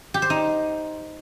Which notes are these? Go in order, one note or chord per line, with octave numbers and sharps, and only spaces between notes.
G4
C5
D#4